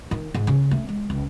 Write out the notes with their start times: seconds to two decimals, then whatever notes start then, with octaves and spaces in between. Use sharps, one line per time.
0.11 D#3
0.34 G#2
0.47 C#3
0.71 A3
0.89 G#3
1.10 C#2